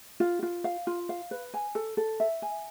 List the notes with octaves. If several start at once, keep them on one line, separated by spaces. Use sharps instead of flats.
F4
F4
F5
F4
F5
B4
G#5
A4
A4
E5
G#5